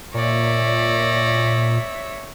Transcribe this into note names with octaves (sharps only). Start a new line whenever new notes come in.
A#2 C#5 D5 E5 A#6